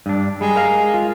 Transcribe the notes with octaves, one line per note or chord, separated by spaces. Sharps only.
G2 D4
G3 G#3
A#4 F5
F4